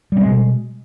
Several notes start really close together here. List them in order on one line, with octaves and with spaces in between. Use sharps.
G3 C4 G#3 B2